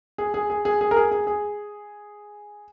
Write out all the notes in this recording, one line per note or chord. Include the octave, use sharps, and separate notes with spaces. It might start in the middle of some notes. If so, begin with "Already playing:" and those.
G#4
G#4
G#4
G#4
G#4
A#4
G#4
G#4
G#4